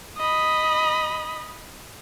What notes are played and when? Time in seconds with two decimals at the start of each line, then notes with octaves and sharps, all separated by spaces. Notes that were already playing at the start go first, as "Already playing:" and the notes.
0.17 D#5 B5